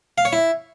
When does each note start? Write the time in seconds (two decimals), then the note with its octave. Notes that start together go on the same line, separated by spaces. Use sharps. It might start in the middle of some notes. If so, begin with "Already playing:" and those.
0.18 F5
0.25 C#5
0.33 E4